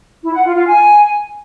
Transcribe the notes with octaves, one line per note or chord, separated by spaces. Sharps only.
E4
F#5
F4
F4
G#5